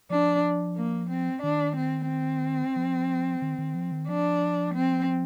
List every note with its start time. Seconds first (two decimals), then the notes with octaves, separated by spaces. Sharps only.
0.10 F3 D4
0.77 A#3
1.10 C4
1.43 D#3 D4
1.76 C4
2.09 C4
2.76 F3
3.42 D#3
3.58 D#3
3.75 F3
3.92 D#3
4.09 F3 D4
4.75 C4